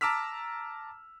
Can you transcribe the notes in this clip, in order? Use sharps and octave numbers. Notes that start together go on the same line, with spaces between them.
A5 A#5 D6 E6 F6 B6